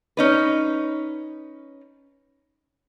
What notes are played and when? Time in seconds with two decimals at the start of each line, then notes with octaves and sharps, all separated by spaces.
0.17 C#4 D#4 B4